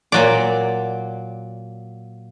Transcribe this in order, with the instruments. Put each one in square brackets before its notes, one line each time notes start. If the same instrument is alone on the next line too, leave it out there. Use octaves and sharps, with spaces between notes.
[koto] A#2 F#3 D5